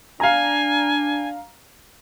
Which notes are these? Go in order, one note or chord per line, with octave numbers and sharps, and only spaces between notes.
D4 F5 G#5 A#5